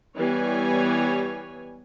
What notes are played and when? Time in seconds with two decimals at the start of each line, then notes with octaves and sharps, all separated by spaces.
0.16 E3 G3 B3 C#5 G#5